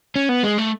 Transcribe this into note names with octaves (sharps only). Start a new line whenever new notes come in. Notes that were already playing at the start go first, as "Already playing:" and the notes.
C#4
B3
G#3
A3